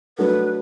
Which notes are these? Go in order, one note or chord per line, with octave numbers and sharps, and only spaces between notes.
F#3 A3 D4 F#4 A4 B4